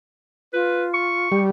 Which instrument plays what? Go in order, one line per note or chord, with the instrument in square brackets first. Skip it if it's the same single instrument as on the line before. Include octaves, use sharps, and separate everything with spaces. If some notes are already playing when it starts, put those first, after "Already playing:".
[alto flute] F4 [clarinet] B4
[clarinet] C#6
[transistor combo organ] G3 [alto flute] G4